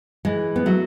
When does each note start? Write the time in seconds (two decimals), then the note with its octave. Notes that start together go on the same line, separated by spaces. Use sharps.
0.25 E3 G#3
0.56 B3
0.66 F#3 A3